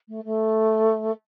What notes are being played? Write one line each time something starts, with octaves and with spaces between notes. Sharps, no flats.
A3
A3